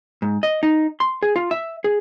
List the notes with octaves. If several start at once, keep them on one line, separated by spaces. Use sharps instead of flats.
G#2
D#5
D#4
C6
G#4
F4
E5
G#4